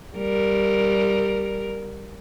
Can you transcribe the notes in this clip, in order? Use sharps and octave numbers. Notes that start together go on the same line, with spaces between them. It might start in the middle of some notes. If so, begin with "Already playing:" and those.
G3 A#4